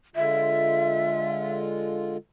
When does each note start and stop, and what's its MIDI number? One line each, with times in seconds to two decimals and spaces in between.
0.16 2.17 50
0.16 2.17 56
0.16 2.17 65
0.16 1.57 76